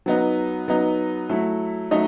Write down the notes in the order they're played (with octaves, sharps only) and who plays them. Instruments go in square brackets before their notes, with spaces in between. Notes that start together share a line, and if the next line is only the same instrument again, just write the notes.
[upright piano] F#3 B3 D#4
F#3 B3 D#4
F#3 A3 E4
F#3 A3 D#4 D#5